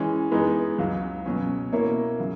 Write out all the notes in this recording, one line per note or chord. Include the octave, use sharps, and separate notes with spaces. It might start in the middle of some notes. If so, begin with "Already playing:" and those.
Already playing: E3 G#3 C#4
E3 G#3 B3 D#4
C#2 C#3 F#3
B2 F#3 C#4
B2 A#3 E4 A#4 C#5
C#3 F#3